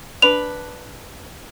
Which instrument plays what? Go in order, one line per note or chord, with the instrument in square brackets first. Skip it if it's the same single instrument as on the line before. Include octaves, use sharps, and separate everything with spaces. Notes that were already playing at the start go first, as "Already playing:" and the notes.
[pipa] D4 B4 [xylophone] F7